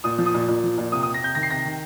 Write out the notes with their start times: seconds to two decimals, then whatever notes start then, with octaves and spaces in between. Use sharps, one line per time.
0.04 A#2 D#6
0.19 F3
0.26 D#6
0.34 A#2
0.48 A#2
0.63 F3
0.78 A#2
0.92 C3 D#6
1.03 D#6
1.07 C3
1.14 A#6
1.21 C3 G6
1.35 D#3 A#6
1.43 C7
1.50 C3 A#6
1.65 D#3